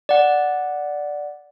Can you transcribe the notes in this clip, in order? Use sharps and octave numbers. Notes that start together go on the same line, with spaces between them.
D5 F#5